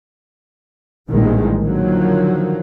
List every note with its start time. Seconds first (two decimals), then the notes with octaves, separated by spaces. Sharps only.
1.10 A#1 A2 D#3 E3 G3 G#3
1.62 D3 D#3 F3 F#3 A#3